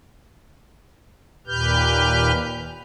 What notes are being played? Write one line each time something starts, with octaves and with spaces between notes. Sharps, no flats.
D#2 A#2 G4 B4 F6 G6